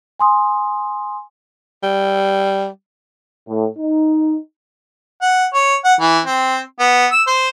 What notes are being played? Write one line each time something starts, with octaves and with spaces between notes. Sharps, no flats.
G#5 C6 D#6
G3
A2
D#4
F#5
C#5
F#5
E3
C4
B3
E6
C5